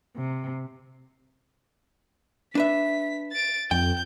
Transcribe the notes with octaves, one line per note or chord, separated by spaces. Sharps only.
C3
D4 B4 E5 B6
A6 D7
F2 G5 G6